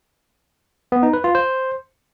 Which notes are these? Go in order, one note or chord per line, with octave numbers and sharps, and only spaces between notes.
B3
D#4
B4
F4
C5